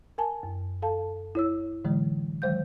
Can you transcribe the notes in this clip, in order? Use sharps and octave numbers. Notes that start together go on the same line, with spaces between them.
A#4 G#5 A5
F#2
A4 F5 A5
E4 C#5 E6
A2 D3 E3 F#3 G#3
D#3 F#3 G#3 C5 F5 G6